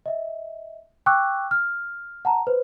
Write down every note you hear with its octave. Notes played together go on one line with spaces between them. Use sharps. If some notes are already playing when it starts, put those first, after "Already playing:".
D#5 E5
G5 C#6 D6 E6 F#6
F6
F#5 A5 A#5
B4 C5